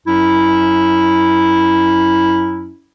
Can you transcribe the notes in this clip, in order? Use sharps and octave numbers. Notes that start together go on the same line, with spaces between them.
F#2 F#3 C#4 E4